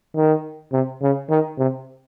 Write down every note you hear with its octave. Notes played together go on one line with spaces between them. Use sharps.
D#3
C3
C#3
D#3
C3